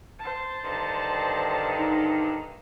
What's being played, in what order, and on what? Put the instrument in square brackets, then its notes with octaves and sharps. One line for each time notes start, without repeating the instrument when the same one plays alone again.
[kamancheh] C5 A5
[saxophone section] G2 D3 D#3
[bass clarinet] D#4